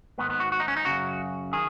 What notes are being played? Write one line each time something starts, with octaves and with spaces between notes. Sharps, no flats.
G#2 D#3 B3
B3
F#4
F#4
D#4
C#4
D#4
F#2 C#3 F#4
D#3 G#4